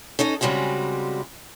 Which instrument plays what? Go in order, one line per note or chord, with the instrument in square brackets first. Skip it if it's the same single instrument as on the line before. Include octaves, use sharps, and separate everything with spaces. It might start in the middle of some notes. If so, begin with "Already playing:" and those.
[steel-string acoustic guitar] C#4 D#4 A4 D#5
C#3 G3 G#3 C4 F#4